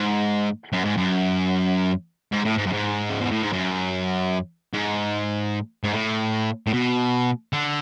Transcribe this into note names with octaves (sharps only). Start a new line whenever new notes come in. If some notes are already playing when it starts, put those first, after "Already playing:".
Already playing: G#2
F#2
G#2
F#2
G#2
A2
G#2
F#2
G#2
C#3
B2
A2
G#2
F#2
G#2
G#2
A2
A2
B2
D3